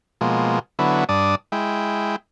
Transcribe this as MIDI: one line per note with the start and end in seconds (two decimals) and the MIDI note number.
0.21 0.59 47
0.21 0.59 53
0.21 0.59 56
0.21 0.59 58
0.79 1.04 50
0.79 1.04 54
0.79 1.04 59
0.79 1.04 64
1.09 1.35 43
1.09 1.35 62
1.09 1.35 74
1.09 1.35 87
1.52 2.16 56
1.52 2.16 64
1.52 2.16 79